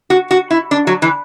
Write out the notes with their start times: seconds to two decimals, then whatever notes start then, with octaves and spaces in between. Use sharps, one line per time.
0.10 F#4
0.31 F#4
0.51 E4
0.71 D4
0.87 F#3
1.02 E3